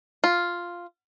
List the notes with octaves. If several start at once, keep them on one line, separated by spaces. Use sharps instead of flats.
F4